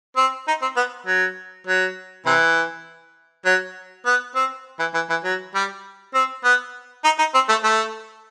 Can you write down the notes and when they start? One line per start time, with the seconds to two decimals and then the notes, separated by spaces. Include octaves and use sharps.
0.17 C4
0.48 D#4
0.62 C4
0.76 B3
1.06 F#3
1.67 F#3
2.26 C3 E3
3.45 F#3
4.06 B3
4.35 C4
4.80 E3
4.94 E3
5.10 E3
5.24 F#3
5.55 G3
6.14 C4
6.44 B3
7.04 D#4
7.18 D#4
7.34 C4
7.49 A3
7.64 A3